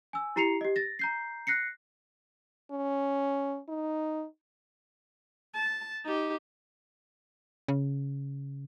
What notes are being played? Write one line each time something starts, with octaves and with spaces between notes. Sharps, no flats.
G#5 E6
E4 G4 A#5 C7 C#7 F7
G4 D#5
A6 A#6
A#5 G6 C7
F#6 A#6 C7 C#7
C#4
D#4
A5
D#4 G4
C#3